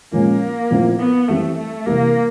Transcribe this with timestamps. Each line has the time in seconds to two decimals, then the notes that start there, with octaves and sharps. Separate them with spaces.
0.12 A#2 F3 G#3 A#3 C#4 F4
0.70 A#2 F3 A3 C4 E4
0.99 B3
1.28 E3 G3 A3 C4
1.58 A3
1.86 C3 E3 G3 A#3